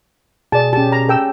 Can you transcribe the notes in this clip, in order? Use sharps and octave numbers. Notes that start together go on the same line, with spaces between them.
B2 G#4 D5 A5
C#4 G4 A5
A#5
A4 G5 E6